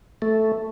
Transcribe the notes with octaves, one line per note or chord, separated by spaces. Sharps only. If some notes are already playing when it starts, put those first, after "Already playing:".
A3